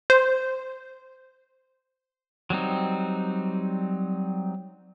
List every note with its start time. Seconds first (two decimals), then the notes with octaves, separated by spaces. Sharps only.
0.10 C5
2.50 F#3 G3 C4 D#4